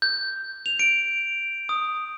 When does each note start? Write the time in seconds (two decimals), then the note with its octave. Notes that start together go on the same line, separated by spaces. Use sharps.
0.02 G6
0.66 F7
0.79 D7
1.69 D#6